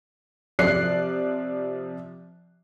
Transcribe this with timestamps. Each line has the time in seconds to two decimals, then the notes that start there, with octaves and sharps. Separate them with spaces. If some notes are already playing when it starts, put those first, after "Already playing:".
0.59 C3 F3 D5 F#6 C7